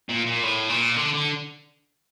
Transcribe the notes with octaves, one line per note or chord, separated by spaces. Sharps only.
A#2
A#2
A2
A#2
D3
D3